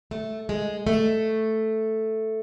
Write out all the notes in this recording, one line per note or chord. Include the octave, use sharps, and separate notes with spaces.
A3
G#3
A3